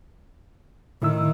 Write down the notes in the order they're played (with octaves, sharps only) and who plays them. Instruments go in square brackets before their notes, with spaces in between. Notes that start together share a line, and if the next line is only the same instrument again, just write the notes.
[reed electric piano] A2 E4 E6 [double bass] D#3